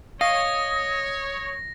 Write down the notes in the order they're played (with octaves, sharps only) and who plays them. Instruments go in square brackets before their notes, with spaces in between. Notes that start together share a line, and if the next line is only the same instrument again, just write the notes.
[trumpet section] C#5 [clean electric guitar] D#5 [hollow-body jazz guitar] F5 [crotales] A#6